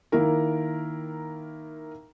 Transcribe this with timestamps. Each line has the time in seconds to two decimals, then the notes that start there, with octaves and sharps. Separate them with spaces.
0.12 D#3 A#3 E4 A#4